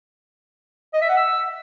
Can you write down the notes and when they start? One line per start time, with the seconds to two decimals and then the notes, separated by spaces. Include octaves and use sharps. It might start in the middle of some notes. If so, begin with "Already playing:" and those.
0.94 D#5
1.01 E5
1.09 F#5
1.17 E6